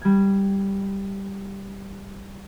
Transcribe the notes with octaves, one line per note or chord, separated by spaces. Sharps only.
G3 G#6